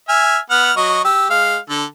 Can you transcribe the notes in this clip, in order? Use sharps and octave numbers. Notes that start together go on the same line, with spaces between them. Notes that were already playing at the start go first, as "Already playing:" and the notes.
E5 G#5 F6
B3 F#5 F6
F#3 D#5 C#6
G4 E6
G#3 F5
D3 A4